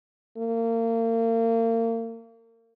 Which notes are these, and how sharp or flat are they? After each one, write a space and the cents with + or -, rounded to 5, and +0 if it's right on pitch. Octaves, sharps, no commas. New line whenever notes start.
A#3 -35